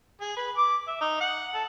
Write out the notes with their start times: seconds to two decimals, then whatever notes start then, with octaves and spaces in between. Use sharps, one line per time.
0.21 G#4
0.37 B4
0.57 D6
0.87 E5
1.01 D#4
1.21 F#5
1.54 A4